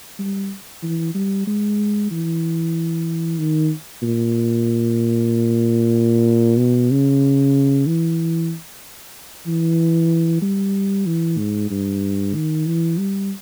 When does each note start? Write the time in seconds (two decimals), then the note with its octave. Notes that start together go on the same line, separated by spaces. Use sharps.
0.19 G3
0.83 E3
1.15 G3
1.47 G#3
2.11 E3
3.38 D#3
4.02 A#2
6.58 B2
6.91 C#3
7.87 E3
9.47 E3
10.42 G3
11.06 E3
11.38 G#2
11.70 G2
12.35 D#3
12.67 E3
12.98 G3